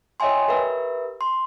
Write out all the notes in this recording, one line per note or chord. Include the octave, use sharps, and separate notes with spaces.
C#5 D#5 E5 G5 G#5 C6
G4 A#4 B4 E5
C6